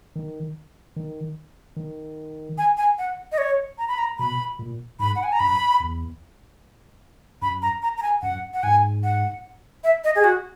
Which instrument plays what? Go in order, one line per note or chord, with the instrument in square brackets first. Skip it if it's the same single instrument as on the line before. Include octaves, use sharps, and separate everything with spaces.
[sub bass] D#3
D#3
D#3
[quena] G#5
G#5
F#5
D#5
C#5
A#5
B5
A#5
[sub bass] B2 [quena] B5
[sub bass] A#2
[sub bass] G#2 [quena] B5
[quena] F#5
G#5
A#5
[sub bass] F#2 [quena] B5
[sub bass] E2
[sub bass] F#2 [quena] B5
[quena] A#5
A#5
A#5
G#5
[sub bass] F#2 [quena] F#5
[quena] F#5
[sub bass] G#2 [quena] G#5
[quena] F#5
E5
D#5
G#4
F#4